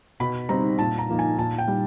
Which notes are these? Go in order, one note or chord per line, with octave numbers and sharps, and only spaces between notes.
B2 B5
G3 C4 D#4 A#5
A#2 A5
A#5
F3 A#3 D#4
G#5
A#2 A5
G5
G3